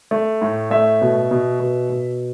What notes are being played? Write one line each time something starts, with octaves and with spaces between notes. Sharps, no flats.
A3
A2
A3 E5
B2
B2
B2
B2